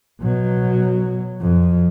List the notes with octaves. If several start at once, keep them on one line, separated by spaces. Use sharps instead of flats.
B2 F#3
F2